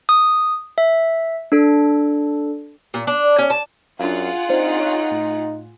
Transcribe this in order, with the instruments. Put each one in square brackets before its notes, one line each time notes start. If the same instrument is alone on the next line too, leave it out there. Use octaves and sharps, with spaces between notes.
[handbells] D#6
E5
D4 A4
[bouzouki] A#2
D4
C#4
A5
[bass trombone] F#2 [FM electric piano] D4 F5 [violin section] F4 G#4 F#5
[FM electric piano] C4 D4 C5 [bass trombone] D#4
[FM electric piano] C#5 C#6 F#6
A2